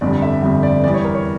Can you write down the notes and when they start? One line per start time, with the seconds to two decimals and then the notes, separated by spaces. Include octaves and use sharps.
0.01 G1 F2 D3 G3 D5
0.22 E5
0.42 G1 F2 D3 G3 E5
0.63 D5
0.84 E2 E3 G3 D5
0.94 C#5
1.04 A#4
1.15 C#5